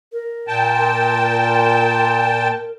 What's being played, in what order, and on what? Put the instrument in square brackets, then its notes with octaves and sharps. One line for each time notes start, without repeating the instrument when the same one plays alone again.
[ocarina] A#4
[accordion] A#2 G5 A5